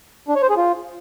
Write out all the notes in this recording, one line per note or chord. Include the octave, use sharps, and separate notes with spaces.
D4
C#5
C5
G#4
F4